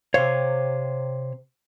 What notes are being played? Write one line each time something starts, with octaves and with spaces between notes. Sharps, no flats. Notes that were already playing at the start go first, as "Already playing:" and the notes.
C3 C5 C#5 F5